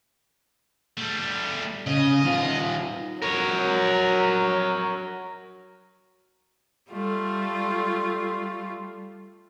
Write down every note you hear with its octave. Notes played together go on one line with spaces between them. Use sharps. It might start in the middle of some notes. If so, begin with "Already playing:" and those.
G3 A3
C#3 D#5
D#3 F4
F#3 A#4 C#5
G3 A3 F4